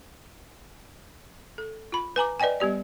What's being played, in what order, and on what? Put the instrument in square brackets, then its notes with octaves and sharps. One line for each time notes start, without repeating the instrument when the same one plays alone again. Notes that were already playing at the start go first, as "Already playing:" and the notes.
[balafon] A4
F4 B5
B4 G#5 A#5 D6
B4 D5 D#5 G5 G#5
G3 B3 G4 D5